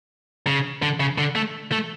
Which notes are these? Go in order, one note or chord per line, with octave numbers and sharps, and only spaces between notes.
C#3
D3
C#3
D3
A3
A3